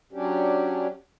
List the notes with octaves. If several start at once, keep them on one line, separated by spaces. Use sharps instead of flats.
F#3 C#4 D4 G4